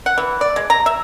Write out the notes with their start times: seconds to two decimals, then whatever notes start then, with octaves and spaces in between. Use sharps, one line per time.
0.06 F#5
0.18 E3
0.41 D5
0.56 G#3
0.70 A#5
0.86 E5